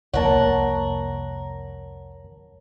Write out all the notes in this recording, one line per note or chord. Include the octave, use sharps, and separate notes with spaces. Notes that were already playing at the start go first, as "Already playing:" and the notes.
C2 F2 A#3 A#4 C#5 F#5 A5